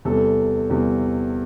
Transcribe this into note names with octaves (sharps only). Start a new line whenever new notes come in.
E2 C3 G3 A4
E2 C3 G3